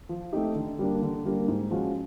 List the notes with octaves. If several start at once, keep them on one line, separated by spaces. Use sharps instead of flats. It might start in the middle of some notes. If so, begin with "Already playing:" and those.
F3
A3 C4 D#4 G4
D3
G3 A#3 D4
D3
G3 A#3 D4
G#2
F3 G#3 C#4 F#4